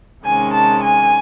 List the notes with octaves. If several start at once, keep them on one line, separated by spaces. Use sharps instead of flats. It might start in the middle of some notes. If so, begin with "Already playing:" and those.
C3 D#3 G#3 C#4 G#5
A5
G#5